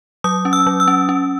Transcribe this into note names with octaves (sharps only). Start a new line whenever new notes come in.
F#3 D#6
C#4
E6
F#3
E6
C#4
C#4